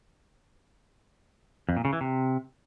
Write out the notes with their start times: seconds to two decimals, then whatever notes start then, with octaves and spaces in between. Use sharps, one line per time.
1.69 F2
1.77 A#2
1.85 C#3
1.93 E3
2.01 C3